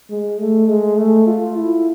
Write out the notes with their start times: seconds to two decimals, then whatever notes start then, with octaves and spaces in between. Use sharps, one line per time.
0.10 G#3
0.39 A3
0.68 G#3
0.98 A3
1.26 F4
1.56 E4